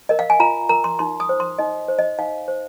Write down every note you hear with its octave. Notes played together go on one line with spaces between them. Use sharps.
A#4 D#5
F5
G#5
F4 A#5
A#4 A#5
C6
D#4 C6
D#6
C5
C6
D#4 D#5
C5
D#5
D#4 F5
C5